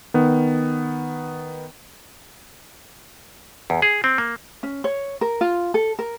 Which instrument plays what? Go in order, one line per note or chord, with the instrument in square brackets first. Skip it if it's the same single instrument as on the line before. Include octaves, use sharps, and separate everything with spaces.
[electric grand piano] D#3 B3
[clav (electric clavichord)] E2
G#4
C4
A#3
[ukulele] C#4
C#5
A#4
F4
A4
A#4